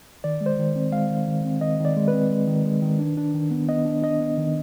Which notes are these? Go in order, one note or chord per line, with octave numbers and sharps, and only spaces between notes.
D#3 D5
G#3
C5
D#3
C4
G#3 F5
D#3
D#3
C4
D#3 D#5
D#3
D5
G#3
B4
C4
G#3
D#3
G#3
D#3
D4
D4
D#3
B3
B3 D#5
D4
D4 D#5
B3
D#3